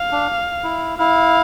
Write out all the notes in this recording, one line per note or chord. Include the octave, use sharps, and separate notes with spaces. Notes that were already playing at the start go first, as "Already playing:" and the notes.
Already playing: F5
D4
E4
E4 F5